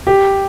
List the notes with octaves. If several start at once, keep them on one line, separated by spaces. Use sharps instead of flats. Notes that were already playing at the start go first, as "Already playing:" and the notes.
G4